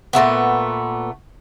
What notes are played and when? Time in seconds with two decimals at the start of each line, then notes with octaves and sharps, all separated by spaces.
0.13 A#2 C#3 A3 B3